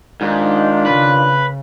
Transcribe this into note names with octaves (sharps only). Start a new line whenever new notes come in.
G#2 D#3 D4 F4
C#3 B4